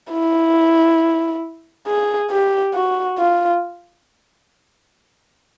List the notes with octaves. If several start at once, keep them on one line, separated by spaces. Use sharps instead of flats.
E4
G#4
G4
F#4
F4